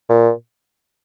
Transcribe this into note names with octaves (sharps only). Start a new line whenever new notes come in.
A#2